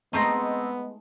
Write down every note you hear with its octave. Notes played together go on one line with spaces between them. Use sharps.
G#3 A3 B3 C4 D#4 D#5